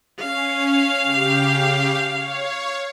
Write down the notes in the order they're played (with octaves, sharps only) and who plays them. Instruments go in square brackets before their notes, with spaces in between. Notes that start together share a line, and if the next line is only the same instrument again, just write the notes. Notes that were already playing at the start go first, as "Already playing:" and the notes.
[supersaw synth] C#4 [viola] F5
[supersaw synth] C#3 G4
C#5